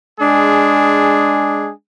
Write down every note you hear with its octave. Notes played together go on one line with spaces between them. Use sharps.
G#3 D4 G#4